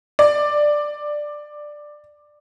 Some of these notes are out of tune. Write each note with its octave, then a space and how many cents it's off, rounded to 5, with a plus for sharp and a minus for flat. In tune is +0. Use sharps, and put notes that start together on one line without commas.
D5 +10